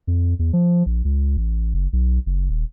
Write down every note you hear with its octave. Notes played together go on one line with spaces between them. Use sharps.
F2
E2
F3
A#1
C#2
A1
F#1
B1
F#1
D#1